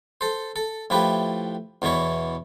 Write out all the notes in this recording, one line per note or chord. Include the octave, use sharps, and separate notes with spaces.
A4 C5
A4
A2 F3 E4 G4 B4
E2 B2 E3 E4 C#5